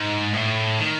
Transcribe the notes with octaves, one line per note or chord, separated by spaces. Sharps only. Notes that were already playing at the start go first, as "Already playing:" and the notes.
Already playing: G#2
A2
D#3